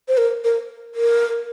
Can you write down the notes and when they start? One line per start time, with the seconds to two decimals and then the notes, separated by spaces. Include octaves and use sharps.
0.08 C5
0.18 A#4
0.44 A#4
0.95 A#4